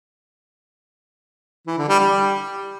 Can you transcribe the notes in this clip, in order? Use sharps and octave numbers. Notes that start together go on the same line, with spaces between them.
E3
D3
G3
G3